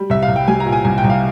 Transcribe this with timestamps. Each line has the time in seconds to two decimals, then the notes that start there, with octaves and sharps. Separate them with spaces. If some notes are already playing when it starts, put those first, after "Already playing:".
Already playing: G3
0.10 C2 E5
0.23 F5
0.28 C2
0.36 G5
0.48 G3 G#5
0.60 A#5
0.66 A#2
0.72 G#5
0.85 C2 G#5
0.98 G5
1.04 C2
1.10 F5